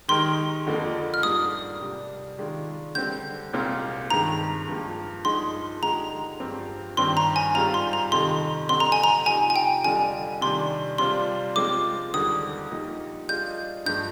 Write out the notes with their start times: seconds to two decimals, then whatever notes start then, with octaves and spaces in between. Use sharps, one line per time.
0.08 D#3 G#3 D#4 G4 A#4 C6
0.66 F2 D3 F3 A#3
1.14 F6
1.23 G#2 G3 A#3 D4 D#6
1.81 C3 G3 D4
2.38 D#3 G#3 D4 F4
2.95 D3 G3 C4 G6
3.53 C2 A#2 G#3 C4 F4
4.10 G2 D#3 G#3 A#5
4.68 G2 F3 A#3
5.25 G2 F3 G#3 D#4 G#4 C6
5.82 D3 G#3 D#4 G4 A#5
6.40 G2 F3 C4 G4
6.97 G2 D#3 G3 C4 C6
7.17 A#5
7.36 G#5
7.54 G#2 G3 C4 F4 A#5
7.74 C6
7.93 A#5
8.12 F2 C3 D#3 C6
8.69 F2 D3 G3 C4 C6
8.80 A#5
8.92 G#5
9.04 A#5
9.26 C3 F3 C4 D#4 G4 G#5
9.50 G#5
9.56 G5
9.84 F2 D3 G3 D4 F4 G#5
10.41 C3 D#3 G3 D4 C6
10.98 C3 G3 D4 F4 C5 C6
11.56 F3 G#3 C4 F4 D6
12.14 D#2 D3 G3 A#3 D#6
12.71 A#2 F3 A#3 D#4 G4
13.29 G3 D4 F4 G#4 D#5 G6
13.86 G2 F3 G#3 G6